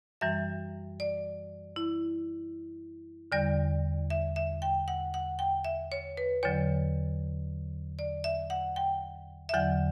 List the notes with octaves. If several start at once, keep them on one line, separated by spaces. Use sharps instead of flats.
F#2 E3 G3 E5
D5
E4
E2 D3 G3 D5
E5
E5
G5
F#5
F#5
G5
E5
C#5
B4
E2 D3 F#3 C#5
D5
E5
F#5
G5
E5
E2 D3 F#3 F#5